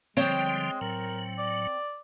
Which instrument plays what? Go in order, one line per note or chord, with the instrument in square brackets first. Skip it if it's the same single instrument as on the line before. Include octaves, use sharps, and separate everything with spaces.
[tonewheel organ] D3 F3 G3 [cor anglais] G#3 [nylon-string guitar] C4 C#5 G5
[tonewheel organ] A2 F#3 [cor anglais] A#4
[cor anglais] D5